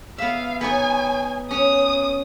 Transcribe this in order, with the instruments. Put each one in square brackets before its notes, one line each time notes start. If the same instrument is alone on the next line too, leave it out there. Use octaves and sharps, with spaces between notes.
[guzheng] B3 E5 [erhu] F5
[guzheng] B3 D#4 C#5 [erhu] G#5
[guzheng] C#4 [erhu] D#6